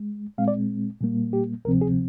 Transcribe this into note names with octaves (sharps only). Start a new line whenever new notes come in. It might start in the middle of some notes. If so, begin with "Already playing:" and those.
Already playing: G#3
A#2 G#3 C4 F5
D5
A#2 G3 A#3
G4
D2 C3 F3 C4 A#4
G#4